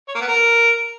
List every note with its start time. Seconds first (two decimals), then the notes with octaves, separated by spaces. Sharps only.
0.08 C#5
0.15 A#3
0.21 B3
0.27 A#4